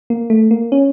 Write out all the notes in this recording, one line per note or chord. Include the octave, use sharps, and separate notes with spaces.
A#3
A3
A#3
C#4